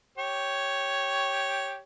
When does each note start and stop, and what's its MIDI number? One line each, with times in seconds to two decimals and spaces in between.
0.18 1.79 67
0.18 1.79 73